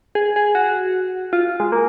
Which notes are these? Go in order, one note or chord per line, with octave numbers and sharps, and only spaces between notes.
G#4
G#4
F#4
F4
G#3
A#3